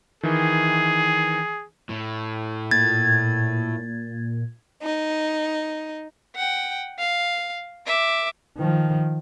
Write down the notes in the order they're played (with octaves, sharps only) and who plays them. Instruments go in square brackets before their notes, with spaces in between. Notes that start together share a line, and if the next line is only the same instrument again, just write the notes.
[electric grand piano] D#3 E3 [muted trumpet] G#4
[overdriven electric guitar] A2
[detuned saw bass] A#2 [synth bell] G#6 [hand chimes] A6
[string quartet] D#4
[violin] F#5 G5
F5
E5 D6
[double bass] D#3 F3